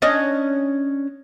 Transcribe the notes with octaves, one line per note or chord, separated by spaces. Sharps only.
C#4 D4 D#5